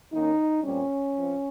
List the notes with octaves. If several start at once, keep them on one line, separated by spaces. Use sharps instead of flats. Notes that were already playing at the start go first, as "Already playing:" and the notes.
D#3 A#3 C#4 D#4
A#2 G3 C4 C#4
F3 C4